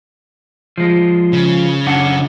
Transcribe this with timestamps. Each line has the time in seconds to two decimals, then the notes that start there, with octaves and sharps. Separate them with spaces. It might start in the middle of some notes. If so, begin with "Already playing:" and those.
0.78 F3 G#3
1.33 C#3
1.86 F#2 D4 F#5